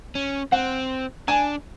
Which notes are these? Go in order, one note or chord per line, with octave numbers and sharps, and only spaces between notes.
C#4
C4 F#5
D4 G#5